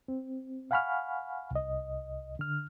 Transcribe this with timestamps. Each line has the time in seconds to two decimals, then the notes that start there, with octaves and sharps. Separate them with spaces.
0.08 C4
0.71 F5 F#5 G#5 B5 C#6 F6
1.51 C2 D#5
2.39 D3 F6